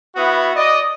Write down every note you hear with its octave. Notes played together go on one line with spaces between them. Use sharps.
B3 E4 F#4
D5 D#5